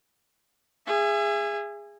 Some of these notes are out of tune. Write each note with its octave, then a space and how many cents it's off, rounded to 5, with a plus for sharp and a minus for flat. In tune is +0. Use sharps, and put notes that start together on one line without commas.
G#4 -15 E5 +30